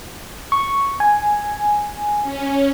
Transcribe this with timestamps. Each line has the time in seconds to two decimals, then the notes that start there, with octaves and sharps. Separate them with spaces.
0.52 C#6
1.00 G#5
2.23 C#4